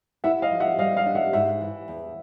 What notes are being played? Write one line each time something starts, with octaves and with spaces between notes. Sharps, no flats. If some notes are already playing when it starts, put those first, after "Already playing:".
E4 E5 F#5
D#5 F5
F3
E5 F#5
G3 D#5 F5
D#5 F5
D4
E5 F#5
G#2 E5 F#5
E3
E2